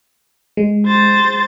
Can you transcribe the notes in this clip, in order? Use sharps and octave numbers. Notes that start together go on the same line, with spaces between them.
G#3
C5 A6